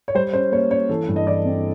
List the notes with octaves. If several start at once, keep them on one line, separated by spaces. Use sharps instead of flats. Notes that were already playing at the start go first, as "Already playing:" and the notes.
C#5
G3 C5
C#4 C5
A#3 C#5
C#4 C#5
E3 A4
G2
D#5
E3 D5
C4